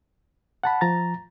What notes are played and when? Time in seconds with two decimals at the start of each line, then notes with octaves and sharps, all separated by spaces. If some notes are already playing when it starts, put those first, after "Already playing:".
0.64 F#5 A5 B5
0.81 F3 A#5 A6